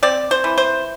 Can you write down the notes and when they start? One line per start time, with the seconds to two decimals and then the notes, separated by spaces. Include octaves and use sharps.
0.03 C4 D5
0.31 C5
0.44 E3
0.58 C5